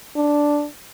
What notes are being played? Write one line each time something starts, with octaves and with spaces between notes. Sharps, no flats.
D4